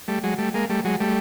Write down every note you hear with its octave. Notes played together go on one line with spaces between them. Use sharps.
G3 A3
F#3 G#3
G3 A3
G#3 A#3
G3 A3
F#3 G#3
G3 A3